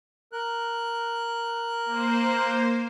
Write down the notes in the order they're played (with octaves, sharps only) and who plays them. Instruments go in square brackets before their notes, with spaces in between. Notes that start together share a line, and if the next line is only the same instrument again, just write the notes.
[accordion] A#4 F#6
[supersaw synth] A#3 C5